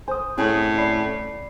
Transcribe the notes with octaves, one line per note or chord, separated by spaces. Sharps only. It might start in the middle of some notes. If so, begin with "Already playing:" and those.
C5 G#5 D#6
A2 C4 C#4 G#4
D5 B5 C7